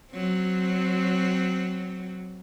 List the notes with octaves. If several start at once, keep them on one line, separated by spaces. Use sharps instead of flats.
F#3 C4